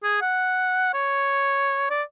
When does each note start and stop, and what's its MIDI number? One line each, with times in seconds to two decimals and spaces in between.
0.03 0.17 68
0.21 0.90 78
0.93 1.88 73
1.90 2.03 74